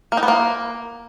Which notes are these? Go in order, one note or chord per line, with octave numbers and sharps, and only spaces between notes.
A#3
D#4
B3
A#3